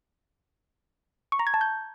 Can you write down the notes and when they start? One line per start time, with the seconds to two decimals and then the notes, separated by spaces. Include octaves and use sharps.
1.32 C#6
1.39 A#5
1.47 G#6
1.54 A5
1.61 G6